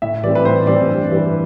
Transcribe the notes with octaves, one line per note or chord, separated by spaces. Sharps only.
A2 E5
E3 G3 C4 D5
B4
A2 C5
E3 G3 C4 D5
G2
E3 G3